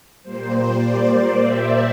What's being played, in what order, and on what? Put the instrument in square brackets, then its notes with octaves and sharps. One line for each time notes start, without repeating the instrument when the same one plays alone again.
[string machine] A#2 G3 A#3 C5
D5
E5